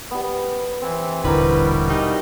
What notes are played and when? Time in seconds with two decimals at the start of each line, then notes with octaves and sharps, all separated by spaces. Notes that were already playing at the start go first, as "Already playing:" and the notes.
0.11 G3 B3
0.82 E3 C4
1.24 D#1 A1 B2 D3 G3 E4 A#4 B4
1.90 D#4 G4